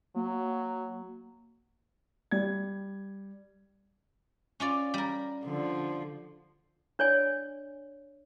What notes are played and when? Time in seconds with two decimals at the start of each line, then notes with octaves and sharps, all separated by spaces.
0.16 F#3 A#3
2.31 G3 G#6
4.60 C#4 F4 D5
4.94 G3 A#4
5.45 D3 F3
6.99 D4 C#5 D5 G#5